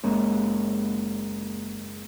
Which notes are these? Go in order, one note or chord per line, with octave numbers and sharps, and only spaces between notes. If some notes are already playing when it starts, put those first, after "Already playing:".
F#1 G#3 A#3 C#4